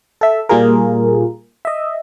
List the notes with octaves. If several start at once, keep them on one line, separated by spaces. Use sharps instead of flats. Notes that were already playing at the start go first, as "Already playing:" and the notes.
A4 E5
A#2 G3 A#3 F4 G#4 A#4
D#5 E5